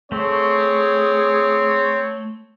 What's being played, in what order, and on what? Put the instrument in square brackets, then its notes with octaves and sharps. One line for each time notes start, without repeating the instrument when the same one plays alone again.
[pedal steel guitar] A3 [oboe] C4 [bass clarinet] G#4 [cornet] C#5